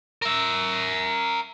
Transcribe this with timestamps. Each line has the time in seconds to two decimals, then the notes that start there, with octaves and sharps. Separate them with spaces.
0.22 A#4 E5